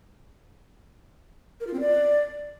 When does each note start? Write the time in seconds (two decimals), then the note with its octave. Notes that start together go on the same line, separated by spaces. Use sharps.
1.60 A#4
1.67 F4
1.74 C4
1.80 D5